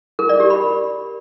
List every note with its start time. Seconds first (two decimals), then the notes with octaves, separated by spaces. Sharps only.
0.19 A#4
0.29 D5
0.40 G4
0.50 B5